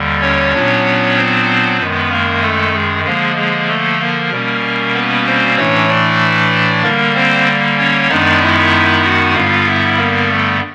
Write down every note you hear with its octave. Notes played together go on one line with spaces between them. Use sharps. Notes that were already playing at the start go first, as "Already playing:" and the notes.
Already playing: D#2 D3 G3
C#4 C#5
A#2 F#3 B3 D4
C4 C5
F#2 D#3 G#3 B3 B4
A#3 A#4
A3 A4
G#3 G#4
D3 F3 G#3 A#3 G#4
G#3 G#4
A3 A4
A#3 A#4
B2 G3 A#3 C#4
B3 B4
C4 C5
A2 E3 A3 C#4 D4 C#5
D4 D5
D3 G3 A#3 A#4
C4 C5
C#4 C#5
F#2 D#3 G#3 B3 D4 D#4 D5
E4 E5
F#4 F#5
G2 D3 G3 B3 F4 F5
E4 E5
A#3 A#4
A3 A4